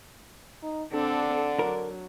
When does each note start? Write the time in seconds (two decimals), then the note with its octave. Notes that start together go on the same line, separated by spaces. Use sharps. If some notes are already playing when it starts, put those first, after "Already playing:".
0.63 D#4
0.93 D3 C4 D4 A4
1.59 F#3 A#4